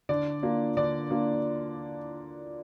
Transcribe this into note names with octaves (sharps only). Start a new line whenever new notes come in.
D3 D5
A#3 D4 F4
D3 D5
A#3 D4 F4